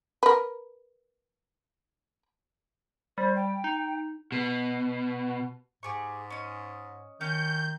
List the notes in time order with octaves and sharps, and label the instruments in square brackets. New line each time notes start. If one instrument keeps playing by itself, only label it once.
[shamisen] A#4 B4
[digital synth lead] G3 [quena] C5
[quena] G5
[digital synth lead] D#4
[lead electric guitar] B2
[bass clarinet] G#2 [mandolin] G4 G#4 C#6
[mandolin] C#4 D#5
[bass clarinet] D#3 [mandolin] C#4 [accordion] G6